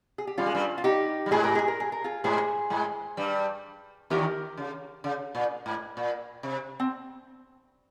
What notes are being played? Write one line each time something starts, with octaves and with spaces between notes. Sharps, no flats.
G#4
G4
G3 C#4 F4
G#3
G2 G3
F4
D#4 G4
G3
G#2 G#3 G#4
A#4
G#4
A#4
G#4
A#4
F4 G#4
G#2 G#3 G#4 C5
G#2 G#3
G2 G3
D#2 D#3 G4 A#4
C#3
C#3
A#2
G#2
A#2
C3
C4